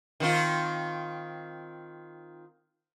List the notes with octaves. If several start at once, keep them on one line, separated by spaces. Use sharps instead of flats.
D#3 C4 F4